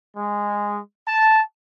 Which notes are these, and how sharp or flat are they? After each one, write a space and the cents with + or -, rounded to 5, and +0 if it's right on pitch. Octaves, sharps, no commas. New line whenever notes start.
G#3 -10
A5 -5